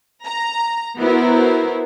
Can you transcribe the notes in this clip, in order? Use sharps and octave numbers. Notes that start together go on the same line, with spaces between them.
A#5
B3 E4 F#4 A#4 C5